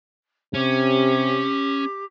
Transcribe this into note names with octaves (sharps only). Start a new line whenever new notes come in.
C3 C#4 G4